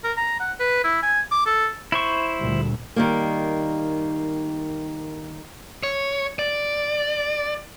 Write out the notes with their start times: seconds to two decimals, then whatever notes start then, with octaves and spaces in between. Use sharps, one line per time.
0.04 A#4
0.17 A#5
0.40 F#5
0.60 B4
0.84 E4
1.03 G#5
1.31 D6
1.46 A4
1.92 E4 C5 C#6
2.40 D2 A#2 G3
2.96 D#3 G3 A#3
5.83 C#5
6.39 D5